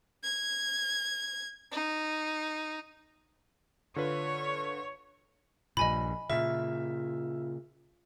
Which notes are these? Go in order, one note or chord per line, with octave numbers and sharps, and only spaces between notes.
G#6
D#4
D3 F4 B4 C#5
A#1 G2 A#2 D#5 G#5 B5
A#2 C#3 F4 E5